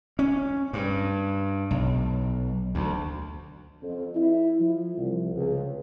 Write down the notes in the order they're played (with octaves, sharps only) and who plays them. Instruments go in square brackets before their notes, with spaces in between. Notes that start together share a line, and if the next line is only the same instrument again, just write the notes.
[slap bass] C#4
G2
B1
D2
[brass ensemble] F2
E4
F3
C2
C#2